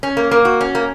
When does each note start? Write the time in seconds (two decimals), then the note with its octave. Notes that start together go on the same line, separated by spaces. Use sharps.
0.03 C#4
0.17 A#3
0.31 A#3
0.45 F#4
0.61 C#4
0.75 A#3